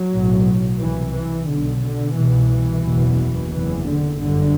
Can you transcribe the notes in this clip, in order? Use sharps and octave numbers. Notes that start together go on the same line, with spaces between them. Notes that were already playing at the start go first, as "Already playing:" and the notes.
Already playing: F#3
B1 A2
C2 C3 E3
E3
B1 B2 D3
D3
C2 B2 E3
F#1 E2 B2
F#1 E2 C3 E3
D3
G1 F#2 D3